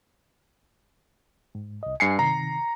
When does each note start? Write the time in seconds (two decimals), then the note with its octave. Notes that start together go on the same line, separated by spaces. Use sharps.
1.55 G#2
1.83 C2 D#5
2.00 G2 G#5 C7 C#7
2.19 C3 D#3 A#5